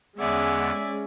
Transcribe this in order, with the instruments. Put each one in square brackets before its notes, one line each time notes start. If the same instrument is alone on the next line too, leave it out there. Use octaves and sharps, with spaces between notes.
[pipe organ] E2 D3 B3 [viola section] G#3 C#4 [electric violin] D5 G#5 [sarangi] E5